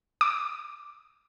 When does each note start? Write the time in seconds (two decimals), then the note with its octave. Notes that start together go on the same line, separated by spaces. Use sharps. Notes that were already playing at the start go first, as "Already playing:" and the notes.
0.21 D6